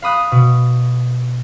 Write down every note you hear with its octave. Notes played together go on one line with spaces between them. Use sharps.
F5 B5 D#6 F#6
B2